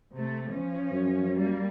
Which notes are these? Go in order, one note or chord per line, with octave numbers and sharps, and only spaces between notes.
C3 A3
F3 C#4
F#2
G3 A#3